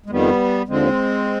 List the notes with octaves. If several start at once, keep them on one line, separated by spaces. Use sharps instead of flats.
G#3
F2 D#3 G3 B3
D#2 D3 F3 G#3 C4